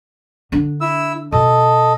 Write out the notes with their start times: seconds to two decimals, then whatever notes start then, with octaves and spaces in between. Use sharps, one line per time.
0.52 D3 D4
0.81 E4 E6
1.32 B2 A4 D#5